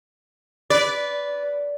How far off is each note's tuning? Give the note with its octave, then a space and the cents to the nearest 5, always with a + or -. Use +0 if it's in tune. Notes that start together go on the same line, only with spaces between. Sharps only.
B4 +0 D5 -20